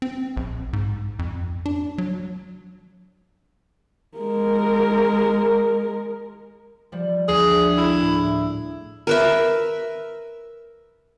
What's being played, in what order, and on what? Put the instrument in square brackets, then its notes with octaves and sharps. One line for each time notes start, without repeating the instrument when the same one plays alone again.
[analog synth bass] C4
A#1
G#2
F2
D4
F#3
[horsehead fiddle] G#3 A#4
[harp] F3 G3
[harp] D2 [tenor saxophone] G#4
[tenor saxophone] E4
[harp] A2
[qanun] A#4 B4 E5